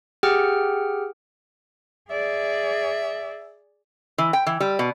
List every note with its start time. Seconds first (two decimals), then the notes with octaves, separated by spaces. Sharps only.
0.23 G4 G#4 F#5 G5 F6
2.10 G#4 D5 E5
4.18 E3
4.33 G5
4.47 E3
4.60 G3
4.79 B2